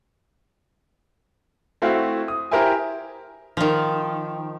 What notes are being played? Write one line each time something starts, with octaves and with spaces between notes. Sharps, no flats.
A3 C4 E4 F#4 F5
D#6
E4 G4 A#4 C5 E5 G#5
D#3 F3